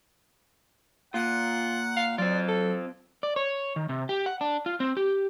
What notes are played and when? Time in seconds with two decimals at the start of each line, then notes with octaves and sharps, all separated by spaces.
1.14 A#2 F4 F#5
1.96 F5
2.18 F#3 C4 F4 D5
2.48 A4
3.23 D5
3.36 C#5
3.76 D#3
3.89 C3
4.09 G4
4.26 F#5
4.41 D4
4.66 F4
4.80 C4
4.97 G4